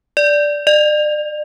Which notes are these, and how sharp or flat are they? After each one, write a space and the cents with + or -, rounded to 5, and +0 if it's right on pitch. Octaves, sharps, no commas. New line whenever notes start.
D5 -5
D5 +40